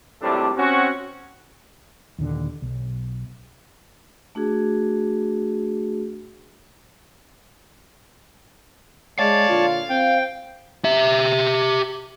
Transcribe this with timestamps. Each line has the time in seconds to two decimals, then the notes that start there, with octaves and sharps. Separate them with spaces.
0.21 G#1 A2 C3 G3 A3 D4
0.57 C4 C#4 F#4
2.18 D#2 A#2 D3
2.62 B1
4.35 A3 D4 F#4 G#4
9.19 G#3 C#5 D5 F5 A5
9.48 A#2 D3 F4
9.90 C4 G5
10.85 G4 E5